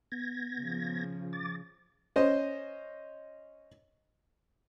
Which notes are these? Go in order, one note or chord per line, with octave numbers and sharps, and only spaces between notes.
B3 G#6 A#6
C#3 F3
D6 A6
C#4 C5 D#5